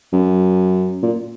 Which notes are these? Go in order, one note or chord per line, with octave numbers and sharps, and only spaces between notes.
F#2
A#2